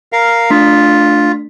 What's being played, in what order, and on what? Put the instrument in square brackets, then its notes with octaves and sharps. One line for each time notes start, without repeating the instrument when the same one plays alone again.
[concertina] A#4 F5
[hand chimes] A3 D4 B6 [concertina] F4